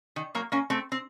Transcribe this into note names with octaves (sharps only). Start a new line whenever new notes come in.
D#3
F#3 A#3
A#3 C#4
A3 C4
C4